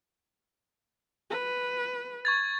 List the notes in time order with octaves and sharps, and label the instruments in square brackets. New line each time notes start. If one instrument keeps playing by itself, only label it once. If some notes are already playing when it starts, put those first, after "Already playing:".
[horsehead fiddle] B4
[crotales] C#6 G#6 A6